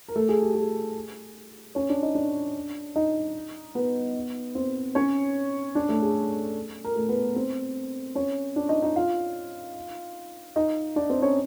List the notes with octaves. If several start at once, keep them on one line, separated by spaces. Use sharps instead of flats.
A#4
A3 A4
G#4
G4
G#4
C#4 C#5
D4 D5
D#4 D#5
D4 D5
D#4 D#5
B3 B4
C4 C5
C#4 C#5
D4 D5
A3 A4
G#4
A#4
A3 A4
B3 B4
C4 C5
C#4 C#5
D4 D5
D#4 D#5
D#4 D#5
F4 F5
D#4 D#5
D4 D5
C4 C5
C#4 C#5